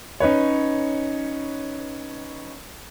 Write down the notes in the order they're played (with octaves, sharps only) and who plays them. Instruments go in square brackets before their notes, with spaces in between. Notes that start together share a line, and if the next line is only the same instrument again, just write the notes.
[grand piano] C#4 D#4 B4 C#5